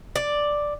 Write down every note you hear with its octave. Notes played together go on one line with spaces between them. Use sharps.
D5